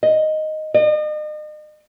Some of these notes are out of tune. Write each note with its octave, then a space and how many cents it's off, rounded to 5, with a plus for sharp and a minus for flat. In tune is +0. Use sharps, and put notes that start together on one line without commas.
D#5 +0
D#5 -40